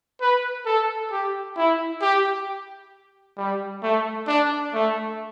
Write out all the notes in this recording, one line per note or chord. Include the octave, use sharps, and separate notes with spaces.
B4
A4
G4
E4
G4
G3
A3
D4
A3